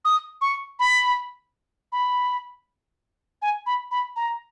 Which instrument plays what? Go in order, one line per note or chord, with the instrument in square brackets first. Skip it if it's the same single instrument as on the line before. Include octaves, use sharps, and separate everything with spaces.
[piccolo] D#6
C#6
B5
B5
G#5
B5
B5
A#5